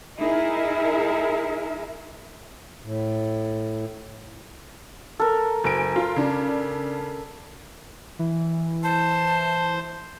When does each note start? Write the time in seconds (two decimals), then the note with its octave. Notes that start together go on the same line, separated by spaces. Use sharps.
0.18 D#4 E4 G#4 A#4 E5
2.82 A2
5.20 A4 A#4
5.64 F#1 G#5 D7
5.96 F4
6.16 C#3 D4
8.19 E3
8.83 C5 A5